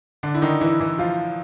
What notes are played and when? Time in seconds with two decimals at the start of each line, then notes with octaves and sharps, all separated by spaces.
0.23 D3 D4
0.35 E4
0.42 D#3 D#4
0.61 E3 E4
0.80 E3 E4
0.99 F3 F4